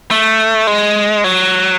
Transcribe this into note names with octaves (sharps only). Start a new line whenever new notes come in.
A3
G#3
F#3